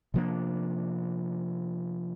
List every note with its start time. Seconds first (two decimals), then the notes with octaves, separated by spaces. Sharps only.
0.14 C3 F3 A#3 D4